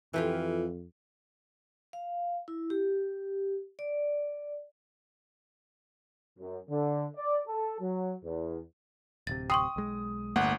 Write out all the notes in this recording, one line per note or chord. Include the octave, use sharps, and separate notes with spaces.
F2 E3 F4 G4 A4
F5
E4
G4
D5
F#2
D3
D5
A4
F#3
E2
D1 C3 A6
G5 C6 C#6 D#6
B1 G#3
D1 G1 A3 A#3 F#5